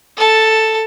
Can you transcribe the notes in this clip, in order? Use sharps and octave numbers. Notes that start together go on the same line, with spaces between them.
A4 A5